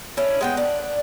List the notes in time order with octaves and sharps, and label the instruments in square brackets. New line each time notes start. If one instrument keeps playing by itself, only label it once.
[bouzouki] C#4 D4 E4
G#3 B3 G5
D4